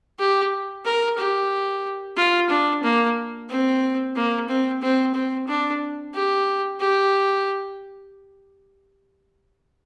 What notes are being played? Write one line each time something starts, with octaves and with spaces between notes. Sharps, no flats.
G4
A#4
G4
F4
D4
A#3
C4
A#3
C4
C4
C4
D4
G4
G4